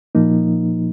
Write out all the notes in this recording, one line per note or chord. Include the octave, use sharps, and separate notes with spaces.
A#2 F3 A#3 D#4